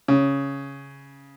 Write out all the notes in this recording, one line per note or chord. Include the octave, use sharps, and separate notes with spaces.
C#3